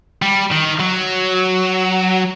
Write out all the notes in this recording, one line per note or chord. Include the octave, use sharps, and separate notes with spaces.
G3
D#3
F#3